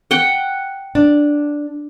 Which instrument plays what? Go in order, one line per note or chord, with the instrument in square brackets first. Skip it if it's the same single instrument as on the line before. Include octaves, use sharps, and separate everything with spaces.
[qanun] F#5 G5
[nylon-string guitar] D4